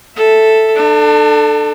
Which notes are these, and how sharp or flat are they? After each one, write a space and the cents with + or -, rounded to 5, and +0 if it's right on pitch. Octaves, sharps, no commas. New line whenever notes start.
A4 +0 E5 +0
D4 +35 A4 +0